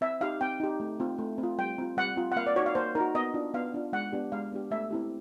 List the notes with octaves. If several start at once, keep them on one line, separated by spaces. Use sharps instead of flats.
C4 E5
D#4 G4 F5
C4 G5
D#4 G4
A3
C4 F4
A3
C4
F4
G3 G5
C4 F4
G3 F#5
C4 F4
F#5
A#3 F5
D5
D#4 F#4 C#5
F5
A#3 C5
D#4 F#4 A#4
B3 D#5
D4 F4
B3 F5
D4 F4
G#3 F#5
B3 D4 G4
G#3 F5
B3 D4 G4
A3 E5
C4 E4 G4